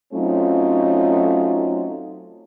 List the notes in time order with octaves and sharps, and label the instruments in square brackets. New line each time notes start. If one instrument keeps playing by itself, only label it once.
[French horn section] F#3 A3 C4 C#4 D#4 F4